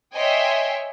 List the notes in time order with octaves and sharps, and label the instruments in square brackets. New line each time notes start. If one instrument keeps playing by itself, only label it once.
[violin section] C#5 D#5 E5 G5 G#5 C6